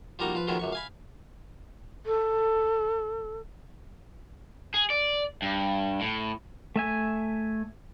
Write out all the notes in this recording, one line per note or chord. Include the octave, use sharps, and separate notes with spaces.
F3 G3 A#3 D#4 F#4
F3 B4
D#3 F3 F#3 G#3 A3 B3
C#2 F#2 C#6
F5 G#5 B5
A4
G#4
D5
G2
A2
A3 E5 G#5